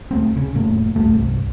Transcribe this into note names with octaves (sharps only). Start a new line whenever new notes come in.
D2 A3 C4
C#3
F1 A2 A3 A#3
D#1 B1 A3
G1 C2